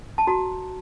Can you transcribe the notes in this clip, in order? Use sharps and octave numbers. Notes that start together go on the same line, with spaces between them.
A5
F#4 A#5